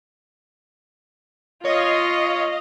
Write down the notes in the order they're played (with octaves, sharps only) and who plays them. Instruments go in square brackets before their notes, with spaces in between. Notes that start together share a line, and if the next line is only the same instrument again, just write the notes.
[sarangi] F4 [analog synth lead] C#5 [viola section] D#5 F5